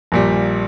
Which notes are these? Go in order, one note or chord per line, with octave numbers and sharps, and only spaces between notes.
A#1 A#2 G3